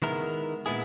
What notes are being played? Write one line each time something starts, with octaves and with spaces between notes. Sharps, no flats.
D#3 G#3 B3 E4 A#4
A#2 G#3 B3 E4 G#4